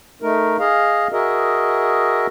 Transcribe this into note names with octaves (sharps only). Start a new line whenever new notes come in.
A3 D#4 A#4
G#4 D#5 F5
F#4 G#4 A#4 D#5 E5